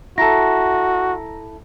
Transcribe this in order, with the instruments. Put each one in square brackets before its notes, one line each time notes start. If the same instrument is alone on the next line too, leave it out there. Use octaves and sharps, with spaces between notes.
[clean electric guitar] E4 A4 [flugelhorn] F#4 [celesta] A#5 A#6